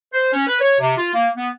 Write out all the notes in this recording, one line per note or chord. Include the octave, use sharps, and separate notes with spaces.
C5
C#4
B4
C#5
C3
F4
A#3
B3